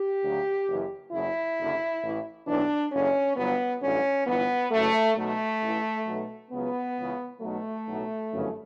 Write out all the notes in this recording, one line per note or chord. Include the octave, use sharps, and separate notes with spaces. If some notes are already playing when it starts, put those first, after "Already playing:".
Already playing: G4
D2 C#3 F#3
F#1 F#2 E3
F#1 E2 C#3 F#3 E4
F#1 F#2 D3
A1 A2 E3
B1 A2 E3 D4
F#1 E2 D3 C#4
G1 G2 F#3 B3
A1 G2 D3 F#3 C#4
G1 G2 E3 B3
F#1 F#2 E3 A3
B1 B2 F#3 A3
A1 A2 E3
B1 B2 F#3
C#2 C#3 F#3 B3
C#2 C#3 E3
B1 B2 F#3 A3
B1 A2 F#3
G1 F#2 C#3 E3